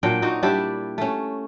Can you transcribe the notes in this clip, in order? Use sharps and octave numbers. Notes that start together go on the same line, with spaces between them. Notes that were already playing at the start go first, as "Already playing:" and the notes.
A#2 F#3 D4 G5
A#2 D#4 F#4
G3 D4 E4 G4
A3 C#4